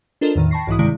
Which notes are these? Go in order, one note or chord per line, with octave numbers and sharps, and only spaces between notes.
D4 F4 A4 A#4 C5 D#5
E2 A2 D#3
G5 A5 B5 C#6 A#6 C7
B1 G#2 E3 E4 D#6
G2 C3 D#3 G#3 E4 D7